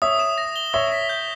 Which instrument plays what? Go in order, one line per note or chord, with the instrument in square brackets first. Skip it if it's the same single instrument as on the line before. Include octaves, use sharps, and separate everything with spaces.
[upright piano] C#5 E5 [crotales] D#6
[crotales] E7
A#6
G7
[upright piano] C#5 E5 [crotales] D#6
[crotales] B6
G6